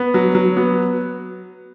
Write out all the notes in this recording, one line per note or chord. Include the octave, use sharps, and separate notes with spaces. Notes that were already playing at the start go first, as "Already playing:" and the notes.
Already playing: B3
F#3
F#3
B3